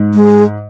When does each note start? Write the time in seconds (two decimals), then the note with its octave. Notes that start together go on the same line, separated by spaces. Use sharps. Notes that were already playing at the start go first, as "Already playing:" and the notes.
Already playing: G#2
0.14 G#3